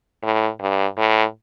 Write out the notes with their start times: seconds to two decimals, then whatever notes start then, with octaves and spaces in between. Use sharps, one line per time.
0.23 A2
0.60 G2
0.98 A2